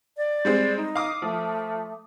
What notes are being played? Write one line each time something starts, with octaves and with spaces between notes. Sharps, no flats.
D5
G3 G#3 C4
D#4
F5 D6 D#6
F3 A3